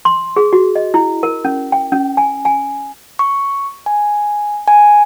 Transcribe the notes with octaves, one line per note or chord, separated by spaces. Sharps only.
C6
G#4
F#4
D#5
E4
A#4
C#4
G5
C#4
G#5
G#5
C#6
G#5
G#5